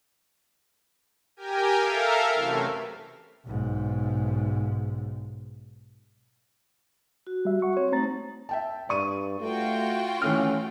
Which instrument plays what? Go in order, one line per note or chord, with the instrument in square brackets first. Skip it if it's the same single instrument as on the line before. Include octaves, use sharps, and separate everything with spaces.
[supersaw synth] G4 A#4 G5 G#5
A4 A#4 E5 F5
F#2 C3 E3 A3
[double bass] B1 G#2
[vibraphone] F#4
[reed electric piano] G3 E5
F#5 C#6
[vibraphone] C4 [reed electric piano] C#5
[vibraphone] A3 D#4 [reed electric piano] C4 A#5 A6
[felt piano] E5 G5 A5
[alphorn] G2 [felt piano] D5 C#6 D#7
[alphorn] A3 [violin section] F4 F#4 G5
[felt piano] E3 A3 F6 [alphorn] C#4